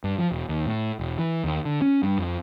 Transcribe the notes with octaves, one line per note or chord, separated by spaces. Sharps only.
G2
F3
E1
D#2
A2
E1
E3
D#2
D3
C#4
G2
F2